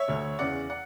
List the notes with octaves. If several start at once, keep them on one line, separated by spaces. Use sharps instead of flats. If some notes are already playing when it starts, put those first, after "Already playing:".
Already playing: C#5 E5
D2 D3
E2 C#3 E3 D5 F#5
D5 F#5